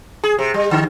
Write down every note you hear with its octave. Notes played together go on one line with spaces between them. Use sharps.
G#4
C3
G3
D3